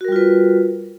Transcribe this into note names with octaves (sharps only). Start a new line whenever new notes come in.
G3 F4 F#4 A#4 B4